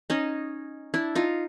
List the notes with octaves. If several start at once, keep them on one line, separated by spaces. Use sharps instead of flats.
C#4 D#4
D4 E4
D#4 F4